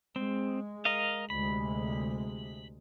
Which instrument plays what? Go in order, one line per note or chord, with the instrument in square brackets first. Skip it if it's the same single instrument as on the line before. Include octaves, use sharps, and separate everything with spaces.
[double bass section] G#3 [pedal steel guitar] C4
[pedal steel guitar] A#4 D#5 F5
[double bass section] D2 C3 G#3 [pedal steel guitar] B5